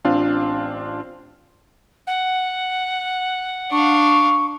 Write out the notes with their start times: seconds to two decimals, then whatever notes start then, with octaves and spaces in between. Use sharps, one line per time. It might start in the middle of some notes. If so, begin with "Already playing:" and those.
0.04 A1 C4 D4 F4 F5
2.07 F#5
3.72 D4 F5 C#6